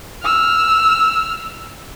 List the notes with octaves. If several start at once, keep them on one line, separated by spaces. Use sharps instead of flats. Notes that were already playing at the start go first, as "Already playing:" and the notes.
E6 F6